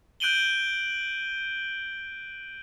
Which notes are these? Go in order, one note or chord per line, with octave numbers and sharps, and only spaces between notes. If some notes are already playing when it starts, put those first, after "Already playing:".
F#6 G6 D7 D#7 F#7 G7